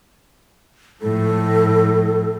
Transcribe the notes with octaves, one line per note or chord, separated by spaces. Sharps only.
A2 F3 A4